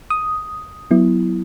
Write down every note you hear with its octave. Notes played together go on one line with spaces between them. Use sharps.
D#6
F#3 B3 E4